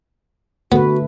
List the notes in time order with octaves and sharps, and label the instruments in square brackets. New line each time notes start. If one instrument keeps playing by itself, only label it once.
[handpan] D3 A3 B4 [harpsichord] B3 [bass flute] F#4